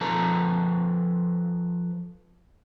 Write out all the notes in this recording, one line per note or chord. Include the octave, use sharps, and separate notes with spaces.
F3 A4 B4 A5 A#5